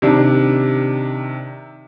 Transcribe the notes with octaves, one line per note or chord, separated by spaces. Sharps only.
C3 D#3 D4